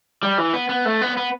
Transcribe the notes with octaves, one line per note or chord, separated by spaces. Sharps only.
G3
E3
B3
B3
A3
B3
B3